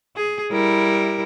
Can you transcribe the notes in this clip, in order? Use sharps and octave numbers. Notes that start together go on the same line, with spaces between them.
G#4
G3 E4 A#4